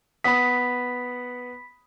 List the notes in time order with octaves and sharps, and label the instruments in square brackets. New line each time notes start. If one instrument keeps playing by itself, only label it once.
[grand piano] B3 F#5 D#6 [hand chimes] B5 B6